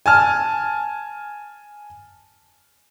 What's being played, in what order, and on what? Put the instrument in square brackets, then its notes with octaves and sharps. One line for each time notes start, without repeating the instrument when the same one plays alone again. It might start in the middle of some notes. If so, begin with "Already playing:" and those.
[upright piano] G#5 A5 F6